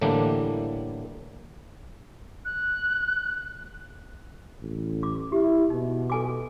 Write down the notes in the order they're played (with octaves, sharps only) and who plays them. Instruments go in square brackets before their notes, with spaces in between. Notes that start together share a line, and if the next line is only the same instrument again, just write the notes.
[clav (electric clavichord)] A2 D3 E3 G3 A#3 D4
[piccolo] F#6
[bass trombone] A1
[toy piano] D6
[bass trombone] E4 [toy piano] G4
[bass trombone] B2 [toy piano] D#4
[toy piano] A4 G#5 D6